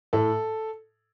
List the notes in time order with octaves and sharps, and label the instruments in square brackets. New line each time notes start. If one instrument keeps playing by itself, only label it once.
[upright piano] A2 A4